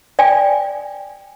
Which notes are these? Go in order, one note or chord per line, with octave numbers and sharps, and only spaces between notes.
D5 G5 G#5